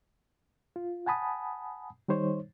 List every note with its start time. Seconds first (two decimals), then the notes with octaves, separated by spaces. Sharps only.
0.76 F4
1.06 F#5 G#5 A5 B5 D#6
2.08 D#3 G3 D#4 C5 C#5